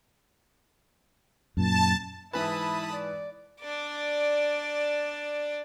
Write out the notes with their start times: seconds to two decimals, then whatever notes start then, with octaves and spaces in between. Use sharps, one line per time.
1.57 F#2 A#2 A5
2.33 G#2 E3 E4 B4 A5 B5 D#6
2.93 D5
3.60 D4 D5